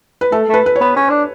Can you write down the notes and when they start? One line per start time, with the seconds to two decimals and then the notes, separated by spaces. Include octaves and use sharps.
0.21 B4
0.32 A3 A4
0.49 A3 B4
0.66 B4
0.76 C#5
0.81 B3
0.96 C#4
1.10 D4